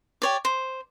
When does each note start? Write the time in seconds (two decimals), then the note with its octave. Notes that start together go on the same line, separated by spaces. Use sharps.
0.22 G4 C#5 D5
0.45 C5